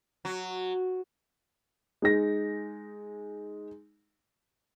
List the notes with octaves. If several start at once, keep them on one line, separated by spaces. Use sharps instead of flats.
F#3
G#3 D#4 A#6